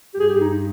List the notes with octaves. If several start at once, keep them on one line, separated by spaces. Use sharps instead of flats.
G4
G2 G#4
G4
D#4